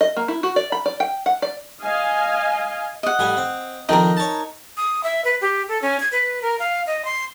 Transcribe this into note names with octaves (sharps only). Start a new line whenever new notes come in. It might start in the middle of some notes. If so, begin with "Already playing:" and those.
D#5
A#3
E4
F#4
D5
B5
D5
G5
F#5
D5
D#5 F5 G#5
D#5 F#5
A1 G3 G#5
C4
F2 D#3 D4 D#4 A#4
C#5 A5
D#6
E5
B4
G4
A4
C#4
G#6
B4
A#4
F5
D#5
C6